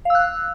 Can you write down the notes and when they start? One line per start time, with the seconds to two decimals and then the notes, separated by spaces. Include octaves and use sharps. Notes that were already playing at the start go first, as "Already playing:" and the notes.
0.05 F5
0.10 E6
0.15 F#6